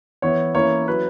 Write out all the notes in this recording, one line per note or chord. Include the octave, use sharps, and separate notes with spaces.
E3 B3 E4 C#5
E3 A#3 C#4 E4 C#5
F#3 C#4 E4 B4